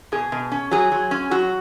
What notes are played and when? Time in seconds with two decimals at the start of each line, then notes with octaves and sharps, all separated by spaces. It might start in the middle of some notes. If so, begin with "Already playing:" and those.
0.12 B2 G#4
0.32 B2
0.52 C#4
0.71 F#3 G#4
0.92 F#3
1.11 C#4
1.31 F#3 F#4